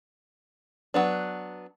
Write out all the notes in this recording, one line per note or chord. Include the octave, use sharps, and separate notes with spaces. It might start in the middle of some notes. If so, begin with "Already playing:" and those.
F#3 B3 D4